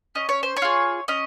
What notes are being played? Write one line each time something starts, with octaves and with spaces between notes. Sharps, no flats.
C#4 D#5
C#5
C5
C#5
F4 G#4
C#4 D#5